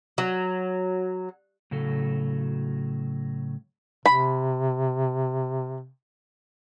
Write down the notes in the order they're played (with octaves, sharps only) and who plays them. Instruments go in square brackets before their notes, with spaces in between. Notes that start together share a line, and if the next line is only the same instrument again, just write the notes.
[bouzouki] F#3
[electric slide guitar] A2 C#3 F#3 F#4 A4
[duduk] C3 [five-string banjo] B5